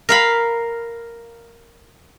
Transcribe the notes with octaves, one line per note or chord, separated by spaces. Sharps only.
A#4 F5 B5